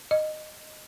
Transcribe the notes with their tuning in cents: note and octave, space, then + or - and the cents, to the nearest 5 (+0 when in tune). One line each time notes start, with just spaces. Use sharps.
D#5 -10